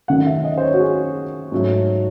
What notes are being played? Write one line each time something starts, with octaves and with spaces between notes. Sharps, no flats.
F#2 D#3 A3 F#5
E5
D#5
C5
C#5
F#4
G#4
G#2 F#3 A3